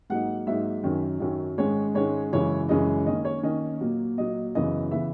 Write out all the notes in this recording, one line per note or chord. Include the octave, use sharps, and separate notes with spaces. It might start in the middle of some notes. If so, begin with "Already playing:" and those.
G#2 F#3 A#3 D#4 F#5
G#2 F#3 A#3 D#4 E5
F#2 D#3 F#3 C#4
F#2 D#3 F#3 C#4
G#2 D#3 G#3 C#4 C#5
G#2 D#3 G#3 C#4 C#5
F#2 C#3 E3 G#3 C#4 C#5
F#2 C#3 E3 G#3 C#4 D#5
D#3 A#3 C#4 D#5
C#5
D#3 A#3 C#4 D#5
A#2 F#3 A#3
A#2 F#3 A#3 D#5
F#2 C#3 E3 B3 D#5
C#3 E3 B3 E5